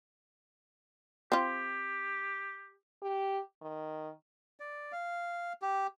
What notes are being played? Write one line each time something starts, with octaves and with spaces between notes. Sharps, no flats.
C4 F4 G4
G4
D#3
D5
F5
G4